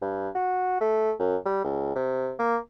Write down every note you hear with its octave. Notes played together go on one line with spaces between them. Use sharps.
G2
F#4
A3
F#2
G3
C#2
C3
A#3